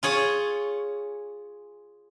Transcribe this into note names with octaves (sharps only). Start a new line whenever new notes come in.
F4 G#4 C#5